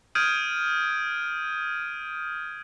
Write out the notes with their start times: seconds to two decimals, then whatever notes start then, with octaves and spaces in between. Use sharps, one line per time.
0.15 D#6 F6 G6 G#6 D7 D#7